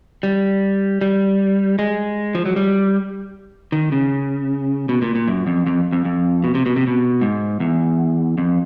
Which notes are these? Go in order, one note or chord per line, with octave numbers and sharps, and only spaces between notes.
G3
G3
G#3
F3
F#3
G3
D#3
C#3
B2
A#2
A#2
F#2
F2
F2
F2
F2
B2
C3
B2
C3
B2
G#2
E2
F2